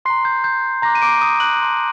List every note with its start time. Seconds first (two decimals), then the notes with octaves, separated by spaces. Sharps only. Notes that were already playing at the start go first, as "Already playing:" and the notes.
0.05 C6 F#6 C7
0.10 A#5
0.25 G6
0.44 G6
0.82 A#5 D6 F#6 A#6
0.95 D#7
1.02 D6 D7
1.21 D#6 D#7
1.40 F#6 F#7
1.59 A5 C6 D#6 F#6